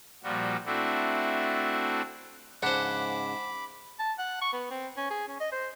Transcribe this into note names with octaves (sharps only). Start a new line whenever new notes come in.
A#2 F3 G3 F#4
A3 C4 D4 E4 F#4
G#2 C#3 D4 C5 F#5 B5 D6
A5
F#5
C#6
B3
C4
C#4
G#4
C#4
D#5
C5